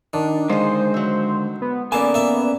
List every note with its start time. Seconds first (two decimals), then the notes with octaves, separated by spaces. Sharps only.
0.13 D#3 D4
0.49 D3 G#3 D#4 G#4 C5 F5
0.94 F#3 E5
1.62 B3
1.92 D#3 A#3 B3 C#4 A4 D5 G#5 A5
2.14 A#3 E5